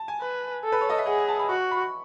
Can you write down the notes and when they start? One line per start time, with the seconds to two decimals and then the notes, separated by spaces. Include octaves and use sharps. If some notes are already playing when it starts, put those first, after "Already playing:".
Already playing: A5
0.08 G#5
0.21 B4
0.65 A4
0.72 B4
0.81 C#5
0.90 D#5
0.98 E5
1.07 G#4 F#5
1.18 G#5
1.28 A5
1.39 B5
1.50 F#4 C#6
1.60 C#6
1.71 B5
1.82 C#6